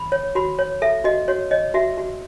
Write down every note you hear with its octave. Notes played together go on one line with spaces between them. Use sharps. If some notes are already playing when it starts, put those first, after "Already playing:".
Already playing: B5
C#5
F#4 B5
C#5
A4 E5
F#4 D#5
F#4 C#5
C#5 D#5
F#4 E5
F#4